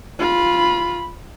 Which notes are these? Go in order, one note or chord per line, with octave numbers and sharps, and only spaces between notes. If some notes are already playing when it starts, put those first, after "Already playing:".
F4 B5